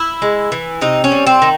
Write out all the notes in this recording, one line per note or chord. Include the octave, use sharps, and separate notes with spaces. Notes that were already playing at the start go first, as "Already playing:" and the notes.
Already playing: E4
G#3
E3
C3 D#4
C#4
G3
C4
D#3